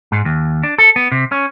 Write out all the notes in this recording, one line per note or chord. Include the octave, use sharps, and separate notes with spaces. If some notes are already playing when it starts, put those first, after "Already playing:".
G#2
D#2
D4
A4
B3
C3
C#4